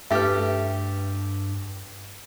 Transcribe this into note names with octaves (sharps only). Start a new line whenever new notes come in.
G2 A3 G4 B4 E5